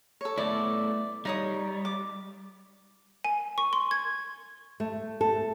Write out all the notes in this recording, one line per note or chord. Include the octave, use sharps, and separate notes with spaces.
A4 C#5
A3 B3 E4 D5
G3 D#4 C#5 D#6
D6
G#5
C#6
C6
G#6
A3
A4